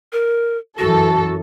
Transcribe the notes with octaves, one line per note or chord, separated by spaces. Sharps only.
A#4
F#2 E3 F#4 A4